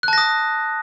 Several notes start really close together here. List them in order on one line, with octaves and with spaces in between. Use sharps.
F#6 A5 A#6 D#6